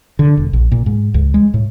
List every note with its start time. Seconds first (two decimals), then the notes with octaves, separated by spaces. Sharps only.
0.19 D3
0.37 E1
0.53 A#1
0.72 A#2
0.86 G#2
1.14 C#2
1.34 G#3
1.54 A2